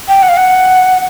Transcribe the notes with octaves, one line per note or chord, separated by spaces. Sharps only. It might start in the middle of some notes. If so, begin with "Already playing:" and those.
G5
F#5
F5
F#5